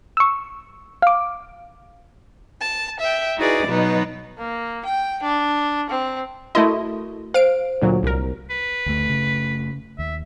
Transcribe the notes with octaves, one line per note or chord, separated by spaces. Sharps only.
C#6 E6
F5 D6
A5
E5 G5
D#4 E4 F#4 G#4 B4 D5
B2 F#3 B3 D#4 B4
A#3
G5
D4
C4
A3 E4 F#4 A#4 D#5
C5 F5 D7
D2 A#2 F#3
C2 A#4
B4
F#1 D2 A3
C#3
D#2 E5